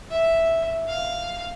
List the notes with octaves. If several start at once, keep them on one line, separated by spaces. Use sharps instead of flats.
E5
F5